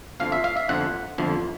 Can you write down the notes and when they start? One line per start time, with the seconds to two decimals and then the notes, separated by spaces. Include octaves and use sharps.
0.20 G1 F2 D3 F3 F5
0.32 E5
0.44 F5
0.57 E5
0.69 G1 F2 D3 F3 F#5
1.18 G1 F2 D3 F3